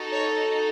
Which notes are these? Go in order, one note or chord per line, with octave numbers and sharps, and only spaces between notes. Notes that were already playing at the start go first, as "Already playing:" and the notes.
Already playing: D#4 F#4 A4
C#5